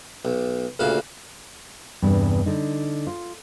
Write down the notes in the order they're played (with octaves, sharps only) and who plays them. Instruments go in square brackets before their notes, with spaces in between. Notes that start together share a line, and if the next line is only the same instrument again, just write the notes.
[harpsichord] B1
D2 A#2 C#3 F#4 F5
[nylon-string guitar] E2 G2 C3
D3 D#4
F4